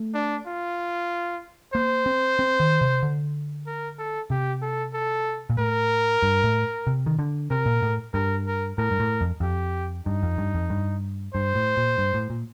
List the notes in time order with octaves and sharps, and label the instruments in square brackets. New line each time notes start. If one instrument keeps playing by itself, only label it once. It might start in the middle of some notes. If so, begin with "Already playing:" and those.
Already playing: [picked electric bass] A3
[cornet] D4
F4
[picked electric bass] A#3 [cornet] C5
[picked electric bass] C4
C4
D#3
C3
D3
[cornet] A#4
A4
[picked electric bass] C3 [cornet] G4
[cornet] A4
A4
[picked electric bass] A#2
[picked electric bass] A2 [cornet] A#4
[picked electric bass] G2
A2
C3
D#3
D3
[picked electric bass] C3 [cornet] A#4
[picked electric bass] A#2
A2
[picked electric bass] G2 [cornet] A#4
[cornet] A#4
[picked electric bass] A2 [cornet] A#4
[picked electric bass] G2
A2
F2
[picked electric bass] F2 [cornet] G4
[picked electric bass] G2 [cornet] D#4
[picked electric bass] F2
G2
F2
G2
[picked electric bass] G2 [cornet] C5
[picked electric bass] A2
A#2
G2
A2
A#2